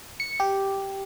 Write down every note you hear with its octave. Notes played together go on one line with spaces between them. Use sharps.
C#7
G4